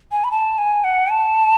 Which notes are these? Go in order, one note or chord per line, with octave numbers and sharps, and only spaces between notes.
G#5
B5
A5
G#5
F#5
A5